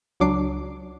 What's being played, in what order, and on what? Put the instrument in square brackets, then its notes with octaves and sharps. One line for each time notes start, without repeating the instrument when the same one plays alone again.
[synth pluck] C#2 F#3 D4 D6 C7